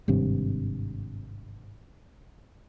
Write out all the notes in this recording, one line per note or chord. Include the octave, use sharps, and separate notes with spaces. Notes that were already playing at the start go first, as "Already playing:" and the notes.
G#1 G2 C3